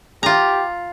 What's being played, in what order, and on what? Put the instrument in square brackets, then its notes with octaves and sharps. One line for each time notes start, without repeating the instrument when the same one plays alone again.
[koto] F4 A#5 [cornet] G4